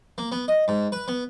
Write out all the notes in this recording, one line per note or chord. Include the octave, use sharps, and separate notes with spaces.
A#3
B3
D#5
G#2
B4
B3